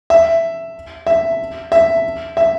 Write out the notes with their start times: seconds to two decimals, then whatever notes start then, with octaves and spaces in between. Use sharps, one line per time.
0.10 E5
1.07 E5
1.72 E5
2.37 E5